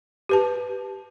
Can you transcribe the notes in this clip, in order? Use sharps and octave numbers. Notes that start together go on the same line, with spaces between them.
G4 B4 A5